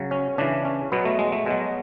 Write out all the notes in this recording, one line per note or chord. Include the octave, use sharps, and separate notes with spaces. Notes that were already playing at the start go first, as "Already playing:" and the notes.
Already playing: C#3 F#3
C#4
C#3 E3 D4
C#4
B2 F#3 B3
A3
G#3
A3
B2 F#3 G#3